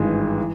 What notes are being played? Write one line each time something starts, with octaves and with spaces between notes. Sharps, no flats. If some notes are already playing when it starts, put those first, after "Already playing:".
Already playing: G#1 G2 E3 G#3
E3